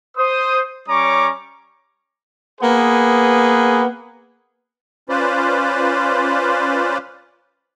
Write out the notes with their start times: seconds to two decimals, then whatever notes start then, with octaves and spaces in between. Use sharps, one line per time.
0.17 C5 D#6
0.88 G3 C#4 C#5 A#5 C#6 D6
2.61 A#3 B3 G#4 B4
5.09 C#4 F4 B4 C5 D5